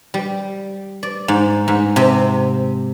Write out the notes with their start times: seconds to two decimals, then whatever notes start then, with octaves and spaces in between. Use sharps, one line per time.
0.14 G3
1.03 D5
1.28 G#2
1.68 G#2
1.96 C3